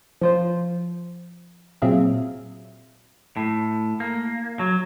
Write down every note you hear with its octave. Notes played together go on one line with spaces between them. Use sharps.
F3 F4 C5
A#2 F#3 C4 G#4 E5 F5
A2
A#3
F#3